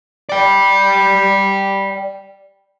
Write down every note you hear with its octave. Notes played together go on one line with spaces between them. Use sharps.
D5 G5